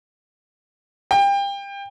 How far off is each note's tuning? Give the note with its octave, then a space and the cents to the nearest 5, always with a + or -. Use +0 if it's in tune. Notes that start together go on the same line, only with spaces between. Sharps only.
G5 +30